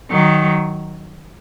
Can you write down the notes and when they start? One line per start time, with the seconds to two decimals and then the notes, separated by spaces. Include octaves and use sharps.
0.11 D#3 F#3